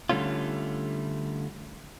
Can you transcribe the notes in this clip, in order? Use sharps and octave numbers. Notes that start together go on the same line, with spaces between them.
D3 G3 A3 C#4 F4